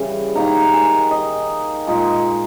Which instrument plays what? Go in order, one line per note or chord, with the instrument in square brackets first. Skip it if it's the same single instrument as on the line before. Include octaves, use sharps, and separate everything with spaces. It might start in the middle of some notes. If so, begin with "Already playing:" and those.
Already playing: [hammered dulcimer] C#3 E3 G3
D#3 A#3 D#4 A#5
G#5
D#5
A#2 G#3 D#4